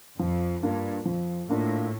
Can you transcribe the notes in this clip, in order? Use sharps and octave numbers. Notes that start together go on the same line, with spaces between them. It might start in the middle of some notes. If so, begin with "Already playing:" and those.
F2 F3
G2 A#3 D4 F4
F2 F3
A2 A#3 D4 F4